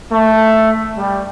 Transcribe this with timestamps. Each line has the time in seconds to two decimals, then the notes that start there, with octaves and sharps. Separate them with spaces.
0.12 A3
0.98 G3